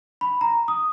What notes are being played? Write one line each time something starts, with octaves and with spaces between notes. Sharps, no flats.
B5
A#5
D#6